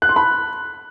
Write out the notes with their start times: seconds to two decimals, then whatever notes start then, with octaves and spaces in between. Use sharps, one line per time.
0.02 F#6
0.09 C6
0.16 B5